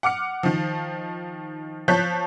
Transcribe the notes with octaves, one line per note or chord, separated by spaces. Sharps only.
F#5 D6 F6 C#7
D#3 F3
F3 C#5 A5 F#6 G6 B6